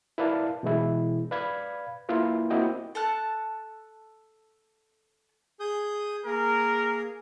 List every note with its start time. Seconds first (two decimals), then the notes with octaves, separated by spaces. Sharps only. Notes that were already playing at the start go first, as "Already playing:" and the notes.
0.18 E4 A#4 B4 D5 F5 A5
0.63 B2 E3 G#3 E4
1.31 B4 D5 F5 B5 G#6
2.09 A#3 E4 F4 A#4 B4
2.50 A#3 C4 E4 F#4 D#5 G5
2.95 A4 A5 F#6
5.60 G#4 D#6 G6
6.26 A#3 G#4 A#4